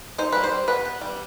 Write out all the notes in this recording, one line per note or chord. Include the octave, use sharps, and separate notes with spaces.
D#4 C5
G3 B4
C5
G3
B3 B4
B3
G3